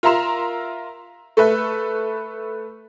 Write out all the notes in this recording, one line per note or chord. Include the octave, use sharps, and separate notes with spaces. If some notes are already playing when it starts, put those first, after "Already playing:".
F4 A#4 E5 A#5 C6 E7
A3 A4 B4 E5